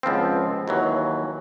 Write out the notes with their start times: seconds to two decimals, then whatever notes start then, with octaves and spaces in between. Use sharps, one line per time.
0.03 C#2 F3 B3 C4
0.68 D#2 E3 F#3